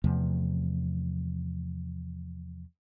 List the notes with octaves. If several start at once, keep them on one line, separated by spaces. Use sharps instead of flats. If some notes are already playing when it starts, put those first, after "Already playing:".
E2 C3 F3 A3